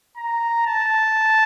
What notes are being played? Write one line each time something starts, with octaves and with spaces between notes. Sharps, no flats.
A#5
A5